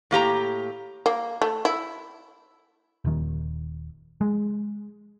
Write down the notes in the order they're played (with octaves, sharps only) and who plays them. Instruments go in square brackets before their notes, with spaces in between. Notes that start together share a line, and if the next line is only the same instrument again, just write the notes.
[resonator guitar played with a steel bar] A2 A#3 G4 A#5
[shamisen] A#3
A3
E4
[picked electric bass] D#1 D#3
G#3